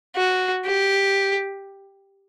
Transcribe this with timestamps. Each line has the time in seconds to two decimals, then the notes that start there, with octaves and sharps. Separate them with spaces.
0.17 F#4
0.66 G4